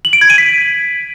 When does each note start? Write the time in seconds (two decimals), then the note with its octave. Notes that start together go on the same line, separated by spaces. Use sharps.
0.05 F#7
0.13 D7
0.21 G#6
0.30 D#7
0.38 B6